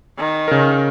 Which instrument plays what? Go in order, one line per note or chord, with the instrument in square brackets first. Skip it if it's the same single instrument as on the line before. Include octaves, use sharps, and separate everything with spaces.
[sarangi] D#3
[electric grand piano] C#3 A#4